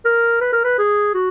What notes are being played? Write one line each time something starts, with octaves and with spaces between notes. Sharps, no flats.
A#4
B4
A#4
B4
G#4
F#4